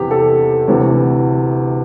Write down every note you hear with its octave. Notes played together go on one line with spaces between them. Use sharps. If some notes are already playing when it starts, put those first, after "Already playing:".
Already playing: E2 C3 E3 G4
A4
D2 C3 E3